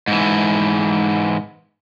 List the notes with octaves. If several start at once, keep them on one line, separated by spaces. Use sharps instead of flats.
G#2 E3